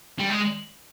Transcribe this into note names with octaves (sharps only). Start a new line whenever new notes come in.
G3
G#3